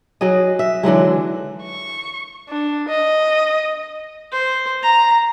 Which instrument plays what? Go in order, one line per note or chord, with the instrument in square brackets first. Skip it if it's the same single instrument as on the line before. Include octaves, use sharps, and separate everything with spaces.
[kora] F#3 G#4 D#5
E5
D3 E3 F#3 G#3
[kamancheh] C#6
D4
D#5
[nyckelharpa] C5
A#5